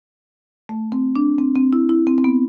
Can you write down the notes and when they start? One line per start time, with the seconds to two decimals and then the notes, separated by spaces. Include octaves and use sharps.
0.69 A3
0.92 C4
1.16 D4
1.39 C4
1.55 C4
1.73 E4
1.89 E4
2.07 C4
2.18 C4
2.24 B3